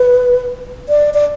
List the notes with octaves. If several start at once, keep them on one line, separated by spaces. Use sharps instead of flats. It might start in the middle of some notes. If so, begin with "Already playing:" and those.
Already playing: B4
D5
D5